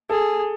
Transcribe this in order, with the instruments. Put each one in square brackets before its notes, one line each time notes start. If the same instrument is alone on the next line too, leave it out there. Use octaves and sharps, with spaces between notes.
[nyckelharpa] G#4 [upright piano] A4